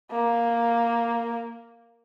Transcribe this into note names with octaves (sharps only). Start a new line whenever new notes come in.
A#3